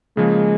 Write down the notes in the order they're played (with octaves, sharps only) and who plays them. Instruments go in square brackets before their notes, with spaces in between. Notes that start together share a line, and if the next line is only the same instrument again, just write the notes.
[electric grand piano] C#3 F3 A#3 [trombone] G#3